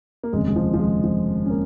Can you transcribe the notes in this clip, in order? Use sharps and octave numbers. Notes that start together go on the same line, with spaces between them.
A#3
F1 D#2 C#3 G#3
G#3
F3
F3
G#3
F3
C#4
A#3